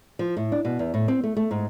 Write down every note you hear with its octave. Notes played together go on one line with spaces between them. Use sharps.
F3
A2
D4
B2
E2
A2
C4
A3
A3
G#2